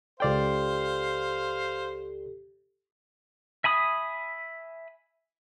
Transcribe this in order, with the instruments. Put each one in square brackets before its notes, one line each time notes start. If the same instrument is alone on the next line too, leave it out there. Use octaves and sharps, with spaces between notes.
[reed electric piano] C#2 D5 G5 [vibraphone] G4 A4 [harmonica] C5 F5
[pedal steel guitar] E5 G#5 B5 D#6